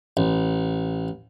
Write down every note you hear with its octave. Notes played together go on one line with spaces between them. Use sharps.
A1